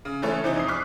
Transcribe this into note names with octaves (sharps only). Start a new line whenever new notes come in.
C#3
C#3 E3 A3 A4 C#5
C3 E3 C4 D4 D#4
F2 D#6 C7
C#6 D6 F6 F#6 B6 C7